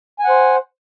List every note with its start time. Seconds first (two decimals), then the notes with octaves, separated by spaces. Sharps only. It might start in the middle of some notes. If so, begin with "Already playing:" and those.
0.20 G#5
0.24 F#5
0.29 C5